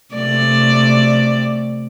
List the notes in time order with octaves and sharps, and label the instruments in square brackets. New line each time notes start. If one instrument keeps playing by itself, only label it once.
[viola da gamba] C3 A3 D5